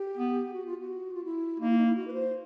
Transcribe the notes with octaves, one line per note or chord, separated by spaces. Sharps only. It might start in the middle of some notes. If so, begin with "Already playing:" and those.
Already playing: G4
B3
F#4
F4
F#4
F4
E4
A#3 D#4
E4
D#4
E4
F#4
B4
C5